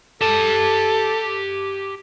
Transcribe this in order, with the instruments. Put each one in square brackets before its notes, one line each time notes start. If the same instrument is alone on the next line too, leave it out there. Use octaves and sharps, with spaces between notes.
[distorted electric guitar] G4 A5 [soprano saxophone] A4